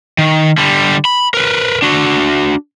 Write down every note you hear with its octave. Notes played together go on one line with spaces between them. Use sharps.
D#3
D3 G3
B5
A#4 B4
D4 F#4